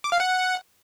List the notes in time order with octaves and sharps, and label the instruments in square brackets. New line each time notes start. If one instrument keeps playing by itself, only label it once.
[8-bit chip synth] D6
F5
F#5